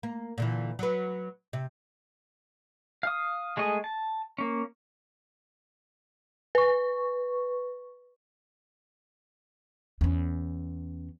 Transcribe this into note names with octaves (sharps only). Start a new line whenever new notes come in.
A#3
A#2 D3 E3
F#3 B4
C3
F5 D#6
G#3 A3 G#4 D#5
A5
A#3 C#4
B4 C#6
E2 C#4